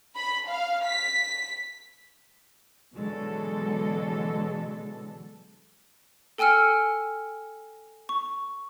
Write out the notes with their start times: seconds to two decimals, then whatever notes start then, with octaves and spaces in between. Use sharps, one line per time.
0.16 B5
0.48 F5
0.85 B6
2.94 B2 D3 E3 F#3 G#3 A4
6.38 A4 G5 G#5 E6 F6 C#7
8.09 C#6